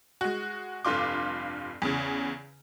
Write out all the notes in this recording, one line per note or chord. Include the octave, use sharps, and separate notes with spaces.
G#3 F#4
F1 G2 F4 C6 D6
E2 C#3